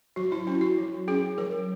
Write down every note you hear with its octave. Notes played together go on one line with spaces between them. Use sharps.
F#3 F#4
E4
C#4 E4
F#4
F#3
C#4 G#4
F#3 A#4